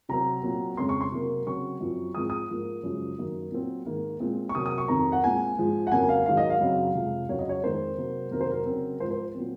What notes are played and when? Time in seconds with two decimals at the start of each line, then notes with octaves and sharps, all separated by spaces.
0.09 C3 F#3 C4 A#5
0.43 A#2 F#3 C4
0.77 F2 C#3 G#3 C4 C6
0.89 C#6
1.01 C6
1.12 C3 F#3 A#3
1.46 C#3 F#3 C4 C#6
1.80 F#2 F3 C4
2.15 G#2 F3 G#3 C4 D#6
2.30 D#6
2.49 G#2 F3 A#3
2.83 F#2 C#3 F3 G#3
3.18 F#2 D#3 A#3
3.52 A#2 F#3 C4
3.86 G#2 D#3 A#3
4.20 A#2 G#3 C4
4.49 C#6
4.55 C3 F#3 A#3 D#6
4.66 D#6
4.78 C#6
4.88 F2 D#3 F#3 C4 A#5
5.12 F#5
5.23 A#2 G#3 C4 G#5
5.58 G#2 F3 G#3
5.87 F#5
5.92 F2 C#3 F#3 A#3 G#5
6.09 F5
6.26 G#2 D#3 F#3 F5
6.37 D#5
6.50 F5
6.60 F#2 C#3 F#3 C4
6.95 F2 C3 F3 G#3
7.29 F2 C#3 F#3 C4 C#5
7.39 D#5
7.49 C#5
7.63 F2 D#3 G#3 C4 C5
7.98 C3 F#3 A#3
8.31 F2 C3 D#3 F#3 A#3 A#4
8.41 C5
8.50 A#4
8.66 C#3 F#3 C4
9.00 G#2 F3 G#3 C5
9.11 C5
9.35 A#2 F#3 C4